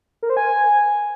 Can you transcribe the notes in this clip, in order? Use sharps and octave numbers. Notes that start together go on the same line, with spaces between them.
A#4
C5
G#5